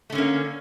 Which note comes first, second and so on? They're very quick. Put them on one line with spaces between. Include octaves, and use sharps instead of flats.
A3 D3 C#4 A#3